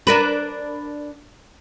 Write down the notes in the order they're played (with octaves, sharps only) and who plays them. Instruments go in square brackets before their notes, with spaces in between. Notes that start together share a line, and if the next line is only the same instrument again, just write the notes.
[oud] D4 A#4 B4